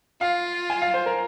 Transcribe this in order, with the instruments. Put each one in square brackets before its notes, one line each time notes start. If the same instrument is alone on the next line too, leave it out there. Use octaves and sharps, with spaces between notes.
[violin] F4 [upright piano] F5
[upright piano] G#5
F5
C5
A#4